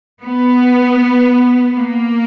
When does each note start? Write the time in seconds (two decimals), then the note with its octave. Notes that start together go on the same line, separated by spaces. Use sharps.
0.23 B3
1.73 A#3